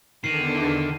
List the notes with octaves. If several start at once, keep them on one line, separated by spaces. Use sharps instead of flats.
E2 D3 D#3 C7 D#7